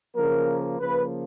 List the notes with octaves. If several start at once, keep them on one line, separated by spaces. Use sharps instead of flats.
C#3 F3 A#3 A#4
C#3 F3 A#3 B4